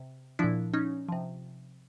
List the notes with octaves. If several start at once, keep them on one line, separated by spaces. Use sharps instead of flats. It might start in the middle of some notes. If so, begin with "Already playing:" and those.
Already playing: C3
A#2 F3 D4 E4
C#4 D#4
C3 F3